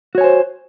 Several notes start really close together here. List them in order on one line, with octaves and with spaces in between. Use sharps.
F#4 C#5 G#5 C5